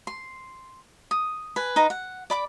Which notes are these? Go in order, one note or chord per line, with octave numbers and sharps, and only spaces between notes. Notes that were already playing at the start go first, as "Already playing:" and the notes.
C6
D#6
B4 G#5
D#4 B4 A#5
F#5
D5 B5 D6